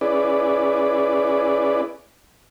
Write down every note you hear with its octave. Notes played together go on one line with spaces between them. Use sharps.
C#4 E4 G#4 B4 D5